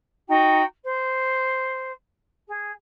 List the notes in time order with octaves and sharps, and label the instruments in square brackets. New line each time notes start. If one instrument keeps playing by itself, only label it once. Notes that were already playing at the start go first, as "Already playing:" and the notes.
[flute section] D#4 F#4 G5 A#5
C5
G#4